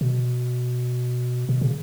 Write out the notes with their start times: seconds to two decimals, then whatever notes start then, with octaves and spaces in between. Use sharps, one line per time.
0.01 B2
1.49 B2
1.61 C#3